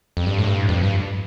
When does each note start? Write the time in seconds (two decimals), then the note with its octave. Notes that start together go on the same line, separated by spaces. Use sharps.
0.17 F2
0.26 G2
0.39 A2
0.47 G2
0.69 F2
0.83 G2